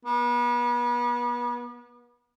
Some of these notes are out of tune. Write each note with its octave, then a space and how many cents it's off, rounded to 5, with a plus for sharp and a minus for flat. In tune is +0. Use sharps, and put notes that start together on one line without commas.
B3 -35